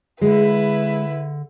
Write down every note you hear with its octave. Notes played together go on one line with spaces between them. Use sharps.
D3 G#3 E4 B4